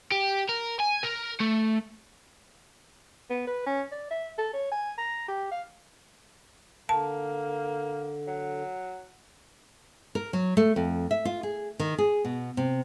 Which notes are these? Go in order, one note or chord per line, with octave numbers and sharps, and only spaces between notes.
G4
A#4
G#5
A#4
A3
B3
B4
C#4
D5
E5
A4
C#5
G#5
A#5
G4
F5
D3 A#3 A5
F#3
A#4
F#3
A3
F2
E5
F4
G#4
D#3
G#4
B2
C3